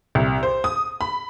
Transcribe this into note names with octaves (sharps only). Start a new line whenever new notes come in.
C2
C5
D#6
B5